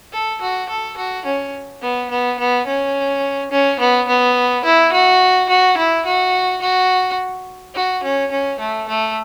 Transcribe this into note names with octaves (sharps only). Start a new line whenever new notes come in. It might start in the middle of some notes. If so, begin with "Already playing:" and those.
A4
F#4
A4
F#4
C#4
B3
B3
B3
C#4
C#4
B3
B3
E4
F#4
F#4
E4
F#4
F#4
F#4
C#4
C#4
A3
A3